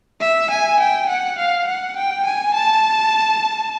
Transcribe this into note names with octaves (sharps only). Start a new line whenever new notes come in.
E5
G#5
G5
F#5
F5
F#5
G5
G#5
A5